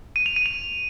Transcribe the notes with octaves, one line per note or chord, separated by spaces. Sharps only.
D#7
F7
D#7
F7